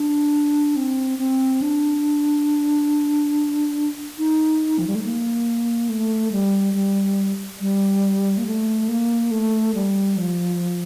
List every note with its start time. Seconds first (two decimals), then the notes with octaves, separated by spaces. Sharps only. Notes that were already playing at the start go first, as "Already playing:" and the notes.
Already playing: D4
0.76 C4
1.19 C4
1.62 D4
4.18 D#4
4.78 F3
4.87 G3
4.95 A3
5.04 A#3
5.89 A3
6.32 G3
6.74 G3
7.60 G3
8.38 A#3
8.46 A3
8.89 A#3
9.31 A3
9.74 G3
10.16 F3